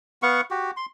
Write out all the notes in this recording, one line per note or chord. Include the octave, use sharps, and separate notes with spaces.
B3 F5 F#5 C#6
F#4 G4
C6